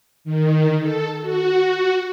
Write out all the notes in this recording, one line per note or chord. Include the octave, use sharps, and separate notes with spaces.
D#3
A4
F#4